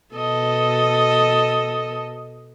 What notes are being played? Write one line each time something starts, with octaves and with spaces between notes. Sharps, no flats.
B2 A4 D#5